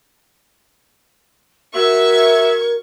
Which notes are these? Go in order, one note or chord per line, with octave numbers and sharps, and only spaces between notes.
F#4 A#4 E5 C#6 G#6